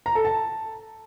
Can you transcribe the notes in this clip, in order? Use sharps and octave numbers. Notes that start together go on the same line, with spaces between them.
A#5
A4
A5